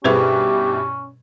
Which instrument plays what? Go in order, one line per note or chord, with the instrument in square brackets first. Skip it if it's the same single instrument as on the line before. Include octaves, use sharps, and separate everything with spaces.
[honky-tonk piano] G2 B2 E4 [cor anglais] C#4 [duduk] G4 [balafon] G#4 B4 C5